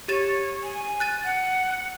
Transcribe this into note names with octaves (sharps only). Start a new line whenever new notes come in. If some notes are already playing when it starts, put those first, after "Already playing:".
G4 C#5 A6 E7
G#5
F#6 A6 D#7
F#5